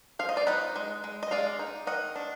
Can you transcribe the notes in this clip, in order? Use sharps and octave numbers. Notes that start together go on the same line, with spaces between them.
F3 F5
D#5
D5
D#4 B4 D#5
G#3
G#3
D#5
G#3 D5 F5
D#4
D#3 D#5 F#5
D4